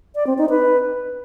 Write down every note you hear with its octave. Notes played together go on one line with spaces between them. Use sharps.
D5
C4
D#4
B4